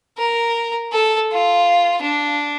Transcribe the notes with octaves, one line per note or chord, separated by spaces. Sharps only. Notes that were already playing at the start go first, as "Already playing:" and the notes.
A#4
A4
F4
D4